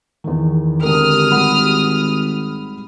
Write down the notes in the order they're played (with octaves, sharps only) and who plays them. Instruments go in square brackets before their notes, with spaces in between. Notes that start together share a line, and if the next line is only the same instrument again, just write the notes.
[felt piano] E2 D#3
[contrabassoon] G#1 [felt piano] D3 G4 A#4 [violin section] D#6 F6
[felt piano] G3 F#5 B5